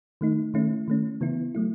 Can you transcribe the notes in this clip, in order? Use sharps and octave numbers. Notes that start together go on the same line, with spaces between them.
D#3 A3 D#4
D#3 A3 C#4 E4
D#3 A3 C#4
C#3 E3 B3 E4
F#3 A3 E4